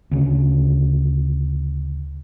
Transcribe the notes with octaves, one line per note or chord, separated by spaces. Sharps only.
D2 C#3